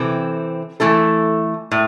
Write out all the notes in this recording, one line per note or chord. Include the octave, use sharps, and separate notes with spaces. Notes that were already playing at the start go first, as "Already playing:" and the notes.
Already playing: C3 E3 C4 A4
E3 A3 E4 A4
A2